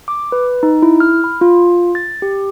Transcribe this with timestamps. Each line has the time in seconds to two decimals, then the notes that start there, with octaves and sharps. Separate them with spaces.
0.08 D6
0.32 B4
0.63 D#4
0.82 E4
1.00 F6
1.24 B5
1.41 F4
1.95 A6
2.22 G4